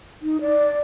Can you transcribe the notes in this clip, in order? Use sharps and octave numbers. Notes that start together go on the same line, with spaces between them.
D#4
D5